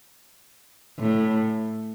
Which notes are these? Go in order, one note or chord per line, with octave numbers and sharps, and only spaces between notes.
A2